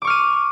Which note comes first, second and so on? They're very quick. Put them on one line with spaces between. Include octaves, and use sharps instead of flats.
D6 C#6 F6 D#7